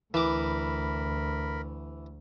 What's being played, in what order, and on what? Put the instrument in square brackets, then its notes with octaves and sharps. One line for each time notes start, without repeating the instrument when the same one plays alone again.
[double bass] D2 [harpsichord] E3 D6 [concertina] A#4 B5